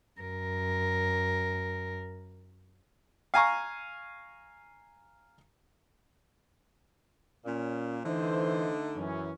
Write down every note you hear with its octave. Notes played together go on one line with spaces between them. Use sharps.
F#2 A#4
F5 G#5 A#5 C#6
A#2 C#4
D3 E3 A3 D#4 C5
F#2 E3 C#4